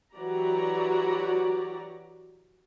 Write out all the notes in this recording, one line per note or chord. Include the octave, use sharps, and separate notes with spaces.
E3 F#3 F#4 G4 D5 A#5